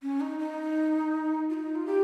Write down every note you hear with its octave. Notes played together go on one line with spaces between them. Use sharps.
C#4
D#4
D#4
F4
D#4
F4
G4